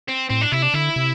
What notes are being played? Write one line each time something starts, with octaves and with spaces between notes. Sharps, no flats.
C4
A2 C4
D4
C3 E4
D4
D3 E4
C3